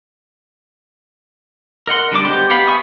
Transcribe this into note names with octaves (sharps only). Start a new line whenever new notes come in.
A#4 D#5 F#5 C6
D3 G3 D4 D6
B3 G4 C5 D#5
B3 G4 F5 B5
E5 F5 G#5 C#6 D#6